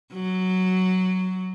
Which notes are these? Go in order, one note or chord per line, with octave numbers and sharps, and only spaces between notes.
F#3